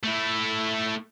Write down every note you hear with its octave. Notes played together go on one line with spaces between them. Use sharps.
A3 E4